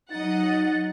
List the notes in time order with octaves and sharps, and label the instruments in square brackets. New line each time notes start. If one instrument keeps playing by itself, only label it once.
[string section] F#3 D#5 F#5 [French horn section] D#4 [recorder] A6